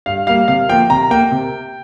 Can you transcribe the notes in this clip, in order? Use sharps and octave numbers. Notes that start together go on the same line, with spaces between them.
G2 F5
G3 A#3 F5
C3 F5
F3 A#3 G5
C3 A#5
A#3 G5
C3